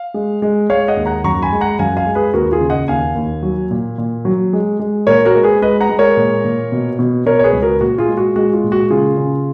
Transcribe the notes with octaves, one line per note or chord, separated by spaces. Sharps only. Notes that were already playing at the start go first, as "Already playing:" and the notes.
Already playing: F5
G#3
G#3
G#3 C#5 F5
D#5 F#5
D#2
F#5 A#5
F#2 A#5 C#6
G#5 B5
G#3
F#5 A#5
F#2 F5 G#5
F5 G#5
G#3
G#4 B4
D#2 F#4 A#4
F4 G#4
C#3
D#5 F#5
D#2 F5 G#5
D#2
F#3
A#2
A#2
F#3
G#3
G#3
A#2 A#4 C#5
F#4 A#4
G#3
G#4 B4
G#3 B4 D#5
F#5 A#5
G#3
A#4 C#5
A#2
A#2
B2
B2
B2 A#4 C#5
C#5
G#4 B4
C#2
F#4 A#4
A#2 F#4
F4 G#4
G#3
F#4
G#3 F#4
F4
A#2
F#4
C#3 F4 G#4
C#3